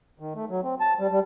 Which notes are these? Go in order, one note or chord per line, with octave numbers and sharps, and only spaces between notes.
D#3
A3
F#3
C4
A5
G3
G3